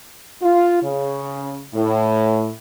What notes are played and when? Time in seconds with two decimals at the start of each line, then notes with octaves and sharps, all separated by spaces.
0.42 F4
0.83 C#3
1.74 A2